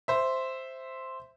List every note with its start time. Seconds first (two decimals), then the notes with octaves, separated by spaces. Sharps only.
0.08 C5 E5